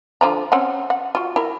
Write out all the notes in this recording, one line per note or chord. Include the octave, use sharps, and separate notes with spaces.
D3 F3 A#5
C4 C#4 F#5
F#5
F4 F#4
E4 A#4